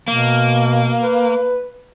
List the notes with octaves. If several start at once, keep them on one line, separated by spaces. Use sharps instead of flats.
B2 A#3
B4